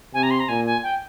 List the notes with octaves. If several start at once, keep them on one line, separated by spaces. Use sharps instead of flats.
C3 G#5
A#5
C6
A#5
A#2 G#5
G#5
G5